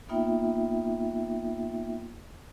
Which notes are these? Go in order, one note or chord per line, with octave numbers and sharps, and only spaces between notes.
A#3 B3 D#4 F4 E5 G5